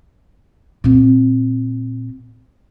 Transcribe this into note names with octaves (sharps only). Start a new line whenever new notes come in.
A#2 C4